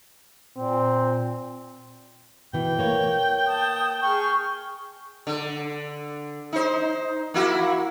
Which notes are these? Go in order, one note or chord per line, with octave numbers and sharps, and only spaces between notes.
A#2 C4
B2 E3 G5
A#3 C#5
A5 D#6
G#4 G5 C#6 F6
D3
D#4 C5
A#3 E4 F#4